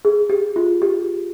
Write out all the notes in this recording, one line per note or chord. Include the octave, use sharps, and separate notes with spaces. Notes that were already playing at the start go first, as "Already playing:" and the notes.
G#4
G4
F4
G4